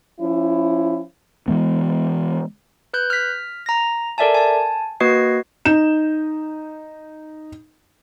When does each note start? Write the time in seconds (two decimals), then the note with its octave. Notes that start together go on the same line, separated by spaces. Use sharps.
0.19 F3 C#4 E4
1.48 E3 G#3 B3
2.94 B4 F#6 G6
3.10 F6 B6
3.66 A#5 A#6
4.18 A4 A#4 D5 E5 G#5 A5
4.34 G#5 A5
5.00 A#3 F#4 B4 D#5 G#6 C7
5.65 D#4 G6 E7